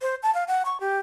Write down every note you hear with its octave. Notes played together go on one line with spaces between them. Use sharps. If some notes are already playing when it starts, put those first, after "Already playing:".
C5
A5
F5
F#5
C#6
G4